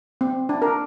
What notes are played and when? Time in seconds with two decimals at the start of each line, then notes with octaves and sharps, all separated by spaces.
0.21 C4
0.49 D4
0.62 A#4